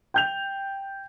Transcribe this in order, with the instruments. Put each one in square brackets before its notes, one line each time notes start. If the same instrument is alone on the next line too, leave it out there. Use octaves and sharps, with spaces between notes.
[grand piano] G5 G6 F7